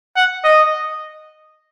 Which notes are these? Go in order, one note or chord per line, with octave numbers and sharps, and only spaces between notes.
F#5
D#5